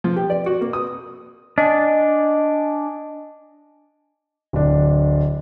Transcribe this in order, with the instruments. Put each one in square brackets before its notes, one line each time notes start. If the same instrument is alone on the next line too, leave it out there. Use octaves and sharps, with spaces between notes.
[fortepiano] F3
G4
D5
F#4
A#3
D#6
[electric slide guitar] D4 [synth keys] D#5 G#5
[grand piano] D1 D4